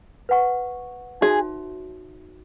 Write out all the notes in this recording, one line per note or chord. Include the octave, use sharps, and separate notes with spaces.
B4 F#5 C#6
D#4 F#4 G#4 C#5 E5